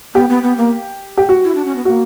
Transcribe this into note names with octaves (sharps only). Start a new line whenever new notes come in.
B3 G4
B3
B3
A#3
G4
F#4
E4
D4
C#4
B3
A#3 F#4